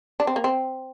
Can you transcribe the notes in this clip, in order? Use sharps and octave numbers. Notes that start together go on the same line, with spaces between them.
D4
C4
A#3
C4